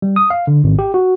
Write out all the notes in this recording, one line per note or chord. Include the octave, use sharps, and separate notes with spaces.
G3
D#6
F5
D3
G#1
G4
F#4